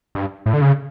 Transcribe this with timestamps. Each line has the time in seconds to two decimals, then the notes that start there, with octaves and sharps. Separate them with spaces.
0.15 G2
0.46 A2
0.54 D3
0.62 C#3